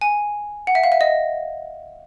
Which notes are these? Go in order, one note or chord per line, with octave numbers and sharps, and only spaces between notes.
G#5
F#5
E5
F5
E5
D#5